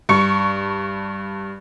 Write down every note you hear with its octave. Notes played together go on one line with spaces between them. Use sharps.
G2 C#6 C#7